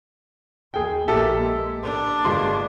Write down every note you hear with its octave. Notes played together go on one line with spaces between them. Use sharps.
D#2 G#4 G5
A#1 A#3 G4 A4 E5
G#3
A#3 D4
G1 G#3 C6